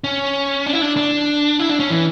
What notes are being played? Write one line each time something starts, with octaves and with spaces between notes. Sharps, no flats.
C#4
D4
E4
D4
D4
E4
D4
C#4
E3